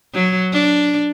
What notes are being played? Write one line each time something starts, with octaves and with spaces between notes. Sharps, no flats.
F#3
D4